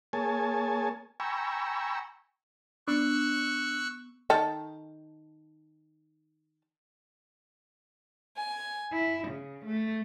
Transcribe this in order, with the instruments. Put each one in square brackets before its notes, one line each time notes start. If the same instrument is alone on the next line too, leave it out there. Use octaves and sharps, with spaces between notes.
[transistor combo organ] A#3 G#4 C#5 G#5 A5
G5 G#5 A#5 B5 C#6 E6
[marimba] B3 [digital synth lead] D4 [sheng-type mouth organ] C#6 E6 F#6
[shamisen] D#3 A4
[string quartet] G#5
E4
C#3
A3